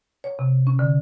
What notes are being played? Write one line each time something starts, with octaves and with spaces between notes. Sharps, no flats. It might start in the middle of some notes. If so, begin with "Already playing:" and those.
C#5
C3
C#4
D3